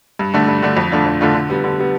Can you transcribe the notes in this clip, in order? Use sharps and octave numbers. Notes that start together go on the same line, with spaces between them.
G2
D3 A3 D4
G2
D3 A3 D4
F2
D3 A3 D4 F4
F2
D3 A3 D4 F4
D3
G3 B3
D3
G3 B3